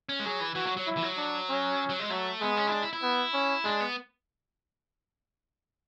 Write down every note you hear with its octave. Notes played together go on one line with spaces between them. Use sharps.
C#4
G#3
F#3 G#4
E3
E3 F#4
F#3
F#3
E4
E3
F#3
D4
C#4
F#3
G#3
F#3 A3
G#3 B3
C#4
E4
D4
E4
E4
B3
C#4
G#3 D4
B3